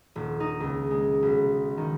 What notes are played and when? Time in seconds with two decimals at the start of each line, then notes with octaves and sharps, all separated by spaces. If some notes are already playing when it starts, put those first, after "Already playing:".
0.16 D#1
0.40 D#4
0.60 C#2
0.91 G#3
1.23 B1
1.77 D#3